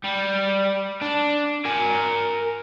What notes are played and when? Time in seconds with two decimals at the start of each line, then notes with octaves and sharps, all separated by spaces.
0.04 G3
1.01 D4
1.65 A#4 G#5